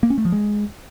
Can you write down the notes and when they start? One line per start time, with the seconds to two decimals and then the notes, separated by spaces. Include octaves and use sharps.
0.03 A#3
0.10 C#4
0.18 A3
0.25 F3
0.32 G#3